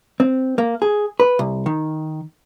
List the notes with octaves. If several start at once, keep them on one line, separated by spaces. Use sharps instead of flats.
C4
A#3
G#4
B4
C2
D#3